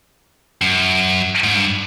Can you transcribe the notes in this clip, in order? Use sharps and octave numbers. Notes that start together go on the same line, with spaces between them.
F#2
G#2
G2